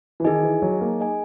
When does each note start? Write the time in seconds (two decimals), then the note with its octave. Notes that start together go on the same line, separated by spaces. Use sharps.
0.20 E3
0.25 D#3 D#4 G#4 D#5 G#5
0.43 E3
0.62 F#3
0.81 A#3
0.99 G#4 D#5 G#5